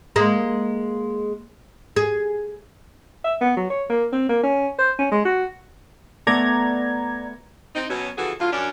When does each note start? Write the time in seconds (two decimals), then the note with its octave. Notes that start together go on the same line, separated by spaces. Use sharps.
0.16 G#3 A#3
1.96 G#4
3.24 E5
3.41 B3
3.57 F#3
3.70 C#5
3.90 A#3
4.12 C4
4.29 A#3
4.43 C#4
4.78 C5
4.99 C#4
5.12 G#3
5.25 F#4
6.27 A3 B3 A4 D5 A#5 G#6
7.75 C4 D#4
7.89 B2 F#3 C#4
8.18 C#3 E3 F3 F#4 G#4 A4
8.39 A2 D3 F#3 F4
8.52 F#2 C#4 D4